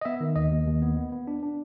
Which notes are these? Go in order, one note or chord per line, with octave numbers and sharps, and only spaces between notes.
D#5
B3 E5
D#3
D#2 D#5
D#2
D#2
B3
B3
B3
D4
D4